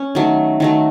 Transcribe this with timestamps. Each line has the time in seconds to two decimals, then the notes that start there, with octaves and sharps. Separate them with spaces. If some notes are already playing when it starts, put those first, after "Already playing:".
Already playing: C#4
0.15 D#3 F#3 A3
0.60 D#3 F#3 A3